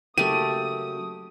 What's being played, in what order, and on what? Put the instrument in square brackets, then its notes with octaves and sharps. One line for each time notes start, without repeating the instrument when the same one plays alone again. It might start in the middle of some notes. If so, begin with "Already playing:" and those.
[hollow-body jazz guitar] C#3 F#3 A#3 [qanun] A3 G4 [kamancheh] D#6 [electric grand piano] D#7